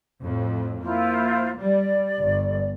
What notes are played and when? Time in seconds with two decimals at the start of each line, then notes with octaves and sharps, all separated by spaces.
0.22 F2 A2
0.82 A#3 E4 F4 C5
1.58 G3 D5
2.20 G1